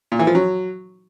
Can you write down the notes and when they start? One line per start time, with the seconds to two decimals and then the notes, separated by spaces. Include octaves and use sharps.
0.12 A#2
0.19 E3
0.27 F3
0.35 F#3